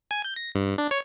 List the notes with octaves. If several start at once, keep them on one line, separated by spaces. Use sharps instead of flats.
G#5
G6
A#6
G2
D4
C#5